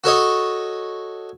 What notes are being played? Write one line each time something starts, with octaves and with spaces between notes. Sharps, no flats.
F#4 A4 C#5 D#5